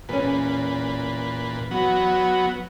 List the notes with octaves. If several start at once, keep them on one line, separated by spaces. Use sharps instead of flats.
E2 A#2 C#4 B4
F#3 B3